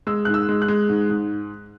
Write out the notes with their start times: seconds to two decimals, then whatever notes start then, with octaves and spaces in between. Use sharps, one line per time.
0.07 G#3 E6
0.25 G#2 F#6
0.34 E6
0.49 G#3
0.62 F#6
0.68 G#3
0.89 G#2
1.10 G#2